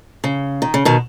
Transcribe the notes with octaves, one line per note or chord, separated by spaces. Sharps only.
C#3
D#3
C#3
B2 D#3